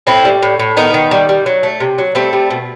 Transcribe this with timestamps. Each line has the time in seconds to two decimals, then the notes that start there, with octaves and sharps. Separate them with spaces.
0.07 A2 C4 E4
0.25 G3
0.42 A2
0.59 A2
0.77 D#3 B3 D#4
0.94 D#3
1.11 G3
1.29 G3
1.46 F#3
1.63 A3
1.80 C3
1.98 F#3
2.15 G3 A3 C4
2.33 G3
2.50 B2